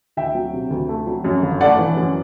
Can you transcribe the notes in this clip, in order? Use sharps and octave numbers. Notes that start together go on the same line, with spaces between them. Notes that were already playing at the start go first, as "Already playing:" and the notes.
D2 E5 G5
F#3
C3
D2
A3
F#3
F#2
G1
A3 D5 F#5
E3
F#2